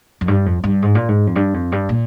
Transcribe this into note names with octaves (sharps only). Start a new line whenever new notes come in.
F2
G2
F2
G2
G#2
A#2
G#2
F2
G2
F2
G2
A#2